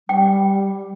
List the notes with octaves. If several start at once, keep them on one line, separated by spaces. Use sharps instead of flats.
G3 G5